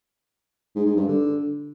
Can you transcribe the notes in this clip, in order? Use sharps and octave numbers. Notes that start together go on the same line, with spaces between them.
G#2
G#2
G2
D3